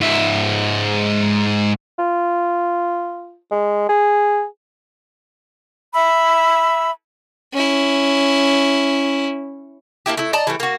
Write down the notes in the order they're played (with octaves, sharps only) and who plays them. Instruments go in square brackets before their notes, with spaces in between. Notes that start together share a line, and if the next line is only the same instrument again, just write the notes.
[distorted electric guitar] G#2 E5
[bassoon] F4
G#3
G#4
[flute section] E5 B5 E6
[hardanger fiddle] C#4 E4
[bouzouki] A#3 D4 E4 G4
A3 E4
D5 D#5 A5 A#5
E3 G3 A3
A#3 F#4